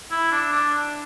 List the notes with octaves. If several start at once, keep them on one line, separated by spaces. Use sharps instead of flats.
E4
D4
D4